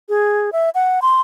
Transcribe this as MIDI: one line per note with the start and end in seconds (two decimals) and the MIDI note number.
0.09 0.50 68
0.53 0.70 76
0.75 1.00 78
1.02 1.21 84